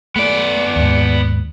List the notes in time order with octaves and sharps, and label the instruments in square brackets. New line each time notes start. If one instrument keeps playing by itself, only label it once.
[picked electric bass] A3 [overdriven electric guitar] B3 D5
[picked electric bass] D#2 G#2